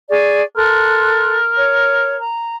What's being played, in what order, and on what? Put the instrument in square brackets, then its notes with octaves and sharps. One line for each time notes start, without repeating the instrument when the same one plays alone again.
[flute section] G#4 D5 C#6
[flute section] A4 C6 F#6 [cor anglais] A#4
[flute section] C#5
A#5